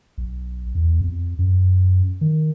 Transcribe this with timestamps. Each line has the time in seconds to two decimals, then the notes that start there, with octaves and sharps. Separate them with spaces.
0.18 B1
0.75 E2
1.01 F2
1.39 F#2
2.21 D#3